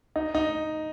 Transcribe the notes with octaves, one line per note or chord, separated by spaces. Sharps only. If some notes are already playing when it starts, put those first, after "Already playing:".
D#4
D#4